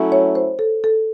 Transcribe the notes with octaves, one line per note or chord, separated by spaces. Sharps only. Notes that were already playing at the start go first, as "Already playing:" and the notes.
Already playing: F#3 A3 C#4 E4 A4
C#5
C5
A4
A4